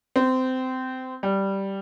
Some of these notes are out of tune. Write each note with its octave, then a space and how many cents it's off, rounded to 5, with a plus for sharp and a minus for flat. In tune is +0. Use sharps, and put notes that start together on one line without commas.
C4 -20
G3 -5